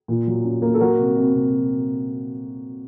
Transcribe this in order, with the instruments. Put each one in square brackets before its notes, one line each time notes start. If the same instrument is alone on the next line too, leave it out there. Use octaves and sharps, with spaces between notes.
[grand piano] A#2
F#3
C#4
A#3
A4
F#3 F#4 A#4
C3
C3
C3